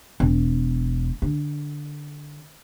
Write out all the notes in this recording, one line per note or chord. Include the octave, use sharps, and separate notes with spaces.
E1
D3